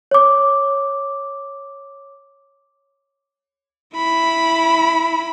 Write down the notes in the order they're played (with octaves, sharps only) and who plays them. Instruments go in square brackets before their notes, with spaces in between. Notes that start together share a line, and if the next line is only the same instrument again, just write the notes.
[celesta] C#5 D6
[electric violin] E4 B5